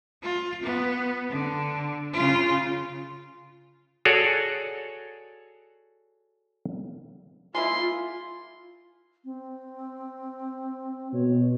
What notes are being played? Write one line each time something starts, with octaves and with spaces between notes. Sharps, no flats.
F4
B3
D3
C#3 F4
F#4 G#4 A4 C#5 D5
G#3 A#3 E4 F4 C6
C4
B2 C#5